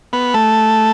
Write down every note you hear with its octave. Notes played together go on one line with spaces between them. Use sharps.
B3
A3